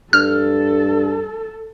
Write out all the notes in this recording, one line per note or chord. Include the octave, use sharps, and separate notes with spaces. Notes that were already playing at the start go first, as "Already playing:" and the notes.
G2 A4 F6